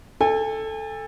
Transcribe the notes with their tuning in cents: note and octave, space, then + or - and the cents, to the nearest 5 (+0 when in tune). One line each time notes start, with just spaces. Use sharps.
A4 +0 G#5 -40